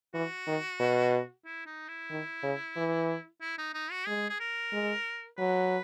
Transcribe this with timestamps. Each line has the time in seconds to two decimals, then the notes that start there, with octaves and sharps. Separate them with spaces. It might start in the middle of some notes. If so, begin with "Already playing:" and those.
0.14 E3 F#4
0.47 D#3
0.80 B2
1.46 E4
1.67 D#4
1.89 E4
2.11 D#3
2.43 C#3
2.76 E3
3.41 E4
3.58 D#4
3.74 D#4
3.91 F#4
4.07 G#3 G#4
4.29 G#4
4.40 A#4
4.72 G#3
5.38 F#3 B4